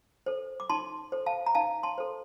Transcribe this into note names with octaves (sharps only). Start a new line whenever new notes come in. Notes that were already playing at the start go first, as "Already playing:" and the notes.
A4 C5
D6
D#4 A5 C6
A4 C5
F5 A5
A#5
D#4 F5 A5
A5 C6
A4 C5